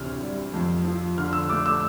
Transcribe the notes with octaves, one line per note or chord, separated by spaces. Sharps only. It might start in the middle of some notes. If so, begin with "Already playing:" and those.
Already playing: D2 C3 E3 F6
G3
F2
F3
D3 F6
E6
A3 D6
E6